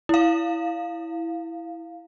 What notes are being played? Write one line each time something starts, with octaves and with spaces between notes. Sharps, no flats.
E4 F5